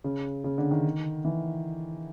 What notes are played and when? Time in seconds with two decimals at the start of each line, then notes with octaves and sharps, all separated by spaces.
0.04 C#3
0.44 C#3
0.58 D3
0.71 D#3
1.25 E3